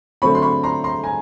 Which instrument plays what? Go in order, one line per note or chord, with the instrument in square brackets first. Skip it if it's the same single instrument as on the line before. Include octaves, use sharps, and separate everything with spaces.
[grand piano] D3 F#3 A3 C4 B5 C#6
C6
B5 C#6
A#5 C6
A#5 C6
G#5 A#5